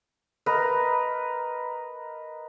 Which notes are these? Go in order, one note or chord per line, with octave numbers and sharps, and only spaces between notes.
A#4 B4 D#5